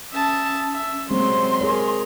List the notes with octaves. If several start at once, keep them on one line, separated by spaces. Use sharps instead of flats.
C#4 E5 A5 D#6
E5
F#3 G#3 A#3 C4 C5 C6
G#4 A#4 C#5